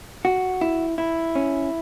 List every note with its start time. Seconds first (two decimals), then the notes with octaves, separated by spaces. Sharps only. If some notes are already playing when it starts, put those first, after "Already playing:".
0.25 F#4
0.61 E4
0.98 E4
1.35 C#4